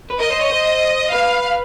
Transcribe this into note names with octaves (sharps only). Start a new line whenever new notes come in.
B4
A#4 D#5
C5
C#5
C5
B4 F5